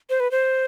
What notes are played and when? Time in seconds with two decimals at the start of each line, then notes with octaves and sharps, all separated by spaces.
0.10 C5
0.20 B4
0.31 C5